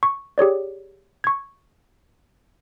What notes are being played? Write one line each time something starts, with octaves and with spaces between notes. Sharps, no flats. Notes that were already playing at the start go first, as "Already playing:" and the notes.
C#6
G4 G#4 C#5 D5
C#6 G#6